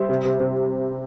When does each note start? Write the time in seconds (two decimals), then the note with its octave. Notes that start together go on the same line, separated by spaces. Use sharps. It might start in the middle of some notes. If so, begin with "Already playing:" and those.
Already playing: G3 C5 E5
0.09 C3
0.25 C3
0.40 C3